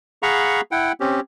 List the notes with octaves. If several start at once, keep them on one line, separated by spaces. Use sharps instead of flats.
G#4 F5 F#5 A#5 B5 C#6
E4 F#5 G5
C4 C#4 G4